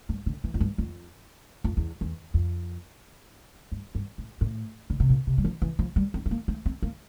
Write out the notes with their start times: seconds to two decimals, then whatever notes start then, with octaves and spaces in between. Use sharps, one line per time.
0.09 G2
0.26 D3
0.44 E3
0.54 F2
0.61 G2
0.78 F2
1.64 F2
1.77 E2
2.01 E2
2.34 F2
3.72 G2
3.95 G2
4.18 A2
4.41 A2
4.90 D3
5.00 C3
5.10 A#2
5.27 C3
5.38 G3
5.45 F3
5.62 E3
5.79 F3
5.96 G3
6.14 C4
6.26 A3
6.31 A#3
6.48 A3
6.66 C4
6.82 A#3